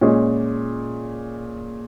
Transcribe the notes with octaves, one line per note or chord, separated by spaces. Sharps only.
A#2 G#3 C#4 G#4 D#5